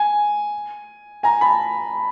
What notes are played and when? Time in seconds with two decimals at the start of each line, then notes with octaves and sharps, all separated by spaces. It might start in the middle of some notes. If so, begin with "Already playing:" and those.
Already playing: G#5
1.23 G#5 A#5
1.41 A5 B5